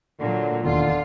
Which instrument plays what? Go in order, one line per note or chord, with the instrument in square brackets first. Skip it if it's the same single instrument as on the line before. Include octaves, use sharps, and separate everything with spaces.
[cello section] A#2 F#3 [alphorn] D3
[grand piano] E1 D#2 [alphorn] D3 [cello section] F4